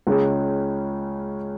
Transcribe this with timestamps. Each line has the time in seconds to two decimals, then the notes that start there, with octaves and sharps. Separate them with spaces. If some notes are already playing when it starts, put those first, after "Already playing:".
0.07 C#2 C#3 G#3 C#4